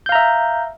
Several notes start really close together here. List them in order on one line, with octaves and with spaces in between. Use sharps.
G6 F5 A#5 E5